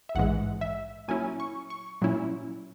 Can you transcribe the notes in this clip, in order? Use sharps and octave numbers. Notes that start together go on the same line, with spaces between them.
E5
A#1 G#2 E3 G#3 F#5
E5
A#2 F#3 C#4 E4 G#5
C#6
C#6
A#2 F#3 C#4 E4